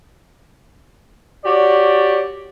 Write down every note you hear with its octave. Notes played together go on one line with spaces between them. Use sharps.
F#4 G4 C#5 D5